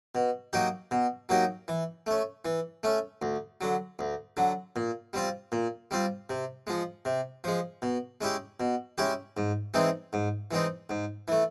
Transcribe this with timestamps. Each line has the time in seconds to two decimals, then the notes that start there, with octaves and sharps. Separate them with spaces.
0.15 B2
0.53 F#3 A#3 D#4 G4
0.91 B2
1.29 F#3 A#3 D#4 G4
1.68 E3
2.07 A3 C#4
2.45 E3
2.83 A3 C#4
3.22 D2
3.61 D3 F#3
3.99 D2
4.37 D3 F#3
4.76 A#2
5.13 G3 C4 F4
5.52 A#2
5.91 G3 C4 F4
6.30 C3
6.67 F3 G#3
7.05 C3
7.44 F3 G#3
7.82 B2
8.21 G#3 C#4 E4 G4
8.60 B2
8.98 G#3 C#4 E4 G4
9.37 G#2
9.74 E3 G#3 C4 D#4
10.13 G#2
10.51 E3 G#3 C4 D#4
10.90 G#2
11.28 E3 A3